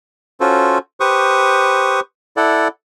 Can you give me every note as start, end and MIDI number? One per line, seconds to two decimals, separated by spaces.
0.40 0.78 61
0.40 0.78 65
0.40 0.78 66
0.40 0.78 69
0.40 0.78 72
1.00 2.00 67
1.00 2.00 71
1.00 2.00 72
1.00 2.00 85
1.00 2.00 87
2.37 2.68 64
2.37 2.68 69
2.37 2.68 74
2.37 2.68 78